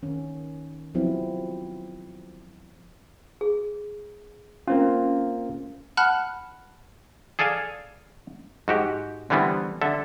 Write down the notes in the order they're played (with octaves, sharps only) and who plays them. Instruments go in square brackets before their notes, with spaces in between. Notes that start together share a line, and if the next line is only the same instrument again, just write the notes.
[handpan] D#3 C#4
F3 F#3 B3 C4 E4
[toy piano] G#4
[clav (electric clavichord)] A#3 C4 F4 [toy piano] C#4
[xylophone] F#5 A5 B5 F6 F#6
[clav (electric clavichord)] G#4 A4 D5 F5 G#5
G#2 F#4 G4
D3 E3 G3 B3 C4
D3 A4 E5